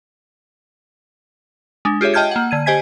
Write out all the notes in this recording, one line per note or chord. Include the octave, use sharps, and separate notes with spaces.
G#3 D4
F4 G4 G#4 C#5 E5
D#5 G5 A5 F6 G6 G#6
A#3 F#5
D3 G#6 D#7
G4 C5 D#5 G#5 G#6 B6